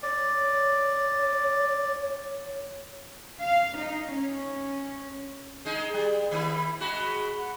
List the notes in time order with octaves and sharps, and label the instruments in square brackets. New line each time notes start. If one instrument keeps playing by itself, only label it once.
[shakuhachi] C#5 [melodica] D5
[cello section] F5
D#4
C#4
[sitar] G#3 D#4 G#4
G3
[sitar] D#3 A#3 E4 [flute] B5
[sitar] G#3 F#4 [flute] B5
[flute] F#5